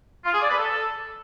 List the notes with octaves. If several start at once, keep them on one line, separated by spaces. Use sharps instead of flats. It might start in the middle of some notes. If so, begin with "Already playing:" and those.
F4
G#4
D5
B4
A4